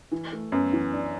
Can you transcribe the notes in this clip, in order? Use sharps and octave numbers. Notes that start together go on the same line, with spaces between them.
E3
A3
F#2 B3
E3
D4